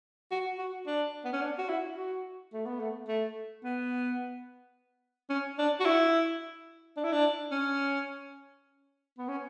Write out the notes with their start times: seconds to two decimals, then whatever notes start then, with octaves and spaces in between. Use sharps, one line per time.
0.31 F#4
0.58 F#4
0.86 D4
1.24 B3
1.33 C#4
1.41 D4
1.58 F#4
1.69 E4
1.97 F#4
2.53 A3
2.66 B3
2.80 A3
3.08 A3
3.64 B3
5.30 C#4
5.59 D4
5.80 F#4
5.86 E4
6.97 D4
7.04 E4
7.12 D4
7.52 C#4
9.18 B3
9.28 C#4